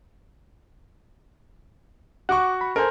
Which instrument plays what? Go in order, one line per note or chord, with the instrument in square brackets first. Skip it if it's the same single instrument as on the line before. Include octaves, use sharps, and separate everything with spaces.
[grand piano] F#4 C#6 [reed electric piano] F#5 D6
[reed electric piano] B5
[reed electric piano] A4 G#5 [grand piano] A#4 C5